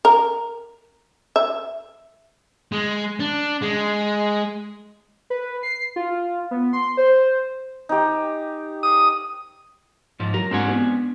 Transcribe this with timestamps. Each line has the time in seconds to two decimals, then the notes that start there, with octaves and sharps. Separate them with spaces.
0.05 A#4
1.36 E5
2.72 G#3
3.20 D4
3.62 G#3
5.30 B4
5.63 C7
5.96 F4
6.51 B3
6.73 C6
6.97 C5
7.89 D#4 G4
8.83 D#6
10.20 G#2 F3
10.34 F#3 A#4
10.51 G#2 C4 D4 G#5
10.68 B3